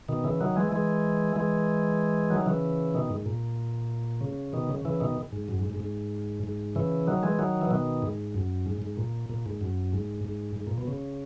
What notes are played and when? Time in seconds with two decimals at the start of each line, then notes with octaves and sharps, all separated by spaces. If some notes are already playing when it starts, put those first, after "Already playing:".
0.09 B2 D#3
0.24 C#3 E3
0.41 D#3 F#3
0.56 E3 G#3
0.72 E3 G#3
1.36 E3 G#3
2.30 D#3 F#3
2.46 C#3 E3
2.94 B2 D#3
3.10 G#2
3.26 A#2
4.21 C#3
4.53 B2 D#3
4.69 C#3
4.85 C#3 E3
5.00 B2 D#3
5.32 G#2
5.48 F#2
5.59 G#2
5.70 G#2
5.80 G#2
6.44 G#2
6.75 C#3 E3
7.07 D#3 F#3
7.23 E3 G#3
7.39 D#3 F#3
7.62 E3
7.71 B2 D#3
8.02 G#2
8.34 F#2
8.66 G#2
8.82 G#2
8.97 A#2
9.29 A#2
9.46 G#2
9.61 F#2
9.93 G#2
10.25 G#2
10.56 G#2
10.67 A#2
10.78 B2
10.88 C#3